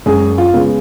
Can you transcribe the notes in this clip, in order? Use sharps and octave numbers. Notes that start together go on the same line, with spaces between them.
F#2 G#3 G#4
F4
C#3 G#3 B3